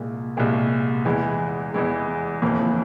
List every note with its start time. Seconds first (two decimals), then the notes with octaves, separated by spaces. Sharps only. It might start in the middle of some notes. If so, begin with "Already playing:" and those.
Already playing: C2 A#2 G#3
0.37 C2 A#2 G#3
1.05 E2 E3 G#3
1.74 E2 E3 G#3
2.42 G1 F2 E3 A#3